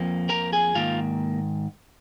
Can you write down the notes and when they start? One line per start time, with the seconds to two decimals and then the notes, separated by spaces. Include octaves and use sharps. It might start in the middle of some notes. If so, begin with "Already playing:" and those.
Already playing: F2 F3 A#3
0.29 A#4 A#5
0.53 G#4 G#5
0.75 G#2 D#3 A#3 F4 F5